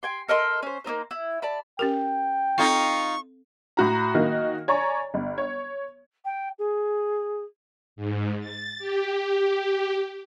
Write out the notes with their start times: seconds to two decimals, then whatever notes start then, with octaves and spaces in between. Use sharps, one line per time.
0.03 G5 G#5 C6
0.28 A4 A#4 D#5 C6
0.63 C#4 C5
0.84 A#3 B3 D#4 C5
1.11 E4
1.42 D5 A5 B5
1.79 C#4 G4 A#4 G5
2.58 C4 D#4 F4 A4 F5 C#6
3.77 A2 F#4 A#5
4.15 D#3 A#3 D#4 F#4
4.68 C#5 D5 G#5 A#5 C#6
5.14 G1
5.38 C#5
6.24 G5
6.58 G#4
7.96 G#2
8.40 A6
8.79 G4